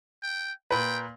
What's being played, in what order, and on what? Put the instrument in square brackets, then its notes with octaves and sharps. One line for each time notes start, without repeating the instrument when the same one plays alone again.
[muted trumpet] G5
[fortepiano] A#2 B4 [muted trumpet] G5